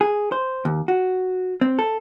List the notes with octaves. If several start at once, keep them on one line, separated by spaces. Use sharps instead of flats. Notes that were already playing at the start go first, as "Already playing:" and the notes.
G#4
C5
D#2
F#4
C4
A4